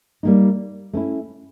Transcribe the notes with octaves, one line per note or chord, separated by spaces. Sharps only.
G3 A#3 D#4
A3 C#4 E4